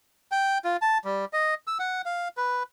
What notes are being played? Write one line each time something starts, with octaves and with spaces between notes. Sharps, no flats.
G5
F4
A5
G3
D#5
E6
F#5
F5
B4